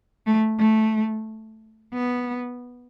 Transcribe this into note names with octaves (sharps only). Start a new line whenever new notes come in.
A3
A3
B3